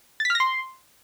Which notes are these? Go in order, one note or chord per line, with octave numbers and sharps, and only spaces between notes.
A6
B6
F6
A#6
C6